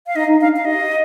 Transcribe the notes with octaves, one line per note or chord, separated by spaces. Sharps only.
F5
D#4 D#5
D#4
D4 F5
D#4 F5
G4 D#5
G4